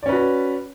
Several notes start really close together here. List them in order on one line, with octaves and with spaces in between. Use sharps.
D5 C#4 B4 F#4